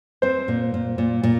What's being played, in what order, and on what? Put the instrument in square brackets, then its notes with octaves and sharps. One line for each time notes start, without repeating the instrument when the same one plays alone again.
[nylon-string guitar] C4 [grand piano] C5
[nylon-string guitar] A#2
A#2
A#2
A#2